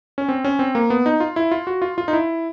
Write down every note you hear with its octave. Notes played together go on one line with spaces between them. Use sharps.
C#4
C4
C#4
C4
A#3
B3
D#4
F4
E4
F4
F#4
F4
F4
D#4
E4